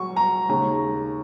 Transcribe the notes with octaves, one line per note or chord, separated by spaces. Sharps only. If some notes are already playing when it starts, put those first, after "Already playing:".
Already playing: F#3 C#6
A#5
D#2 C#3 G#3 A#5